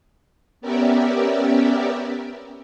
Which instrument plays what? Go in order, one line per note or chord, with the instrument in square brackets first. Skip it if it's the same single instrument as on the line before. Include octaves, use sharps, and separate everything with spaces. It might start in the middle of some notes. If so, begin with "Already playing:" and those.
[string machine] B3 C#4 G4 A#4 D5 E5